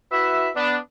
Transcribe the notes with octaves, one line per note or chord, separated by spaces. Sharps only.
E4 F#4 B4 E5
B3 D4